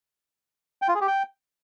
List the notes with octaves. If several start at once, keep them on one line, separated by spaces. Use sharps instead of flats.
G5
F4
G#4
G4
G5